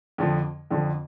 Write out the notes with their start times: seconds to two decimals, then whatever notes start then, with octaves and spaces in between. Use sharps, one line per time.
0.18 F2 D3 F3
0.70 F2 D3 F3